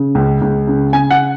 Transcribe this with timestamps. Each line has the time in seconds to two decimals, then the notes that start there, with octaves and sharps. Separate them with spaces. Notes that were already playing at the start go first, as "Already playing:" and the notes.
Already playing: C#3
0.15 C#2
0.42 C#2
0.67 C#3
0.93 C#3 G#5
1.11 F#5